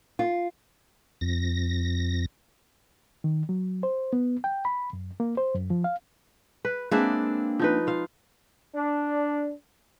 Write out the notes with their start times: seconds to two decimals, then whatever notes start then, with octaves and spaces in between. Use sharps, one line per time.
0.19 F4
1.21 F2 A#6
3.24 D#3
3.49 F#3
3.83 C5
4.13 B3
4.44 G5
4.65 B5
4.93 F#2
5.20 A#3
5.37 C5
5.55 F#2
5.70 F3
5.84 F5
6.65 B4
6.91 G#3 A#3 C4 D4 B4 E5
7.59 F3 D#4 B4
7.87 F4 F5
8.75 D4